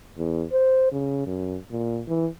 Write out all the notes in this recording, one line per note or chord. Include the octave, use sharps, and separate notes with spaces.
E2
C5
C#3
F#2
A#2
E3